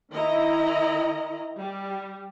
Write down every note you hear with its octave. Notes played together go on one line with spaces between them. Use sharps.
D#3 E4 D#5 A#5
G3